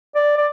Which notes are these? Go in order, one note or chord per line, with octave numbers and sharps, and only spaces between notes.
D5
D5